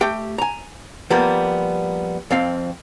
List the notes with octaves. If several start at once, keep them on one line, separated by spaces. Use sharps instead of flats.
A3 G4 G5
G#5 A#5
F3 G3 A#3 B3
F2 C4 F5